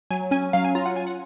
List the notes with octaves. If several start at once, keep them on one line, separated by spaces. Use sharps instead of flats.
F#3 G#5
C#4 G#5
F#3 F5
G#5
F4 A#5
F#5
F4 G#5
F#5